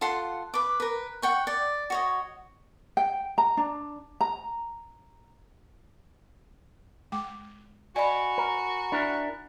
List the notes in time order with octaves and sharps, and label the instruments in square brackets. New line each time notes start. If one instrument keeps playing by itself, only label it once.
[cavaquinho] F4 A4 F#5 C6
B4 D6
A#4 B4
F#5 G5 C#6
D5
F#4 C#5 D#5
[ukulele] G5
A#5
D4
A#5
[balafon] G#3 G5 D6
[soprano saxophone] F#4 [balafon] D5 D#5 [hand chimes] G#5 B5
[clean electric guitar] A#4
D4 E4 A#4